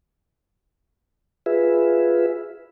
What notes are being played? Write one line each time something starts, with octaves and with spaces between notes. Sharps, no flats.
F4 G#4 B4 E5